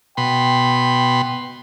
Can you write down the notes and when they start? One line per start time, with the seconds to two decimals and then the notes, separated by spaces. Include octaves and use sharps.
0.17 B2 G5 B5 C6